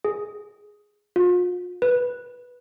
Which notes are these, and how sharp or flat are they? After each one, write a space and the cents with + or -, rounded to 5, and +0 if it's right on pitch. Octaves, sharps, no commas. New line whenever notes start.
G#4 +5
F4 +40
B4 -10